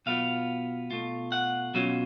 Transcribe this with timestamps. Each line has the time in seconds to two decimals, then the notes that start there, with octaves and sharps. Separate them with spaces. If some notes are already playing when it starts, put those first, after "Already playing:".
0.06 B2 F#3 B3 F4 F5
0.91 B2 A3 F4
1.32 F#5
1.74 B2 F#3 C#4 F4